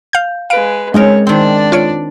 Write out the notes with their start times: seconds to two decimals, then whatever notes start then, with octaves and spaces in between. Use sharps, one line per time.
0.13 F5 G6
0.50 G#3 B4 F5 D7
0.94 G#3 C4 C#4 D#4 A#4 C#5
1.27 D#3 C4 D4 D5
1.72 F4 C#5 D7